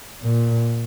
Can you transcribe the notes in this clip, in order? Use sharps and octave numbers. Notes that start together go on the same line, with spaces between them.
A#2